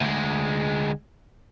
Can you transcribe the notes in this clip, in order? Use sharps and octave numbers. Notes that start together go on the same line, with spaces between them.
D2 G#3